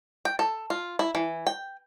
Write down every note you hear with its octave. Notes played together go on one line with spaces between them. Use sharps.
G5
A4
F4
E4
E3
G5